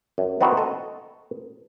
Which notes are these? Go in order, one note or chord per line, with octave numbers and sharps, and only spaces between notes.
F#2
B3 C4 D#4 E4 F#4
A4 D#5